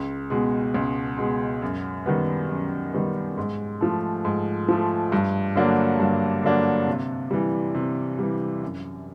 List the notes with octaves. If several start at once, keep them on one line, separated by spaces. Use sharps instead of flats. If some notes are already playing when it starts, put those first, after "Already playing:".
Already playing: C#2
B2 G#3
C#2
B2 G#3
F#2
D#3 G3 B3
F#2
D#3 G3 B3
G#2
F3 A3
G#2
F3 A3
G2
D3 F#3 A#3 D4
G2
D3 F#3 A#3 D4
C3
E3 G3
C3
E3 G3
F#2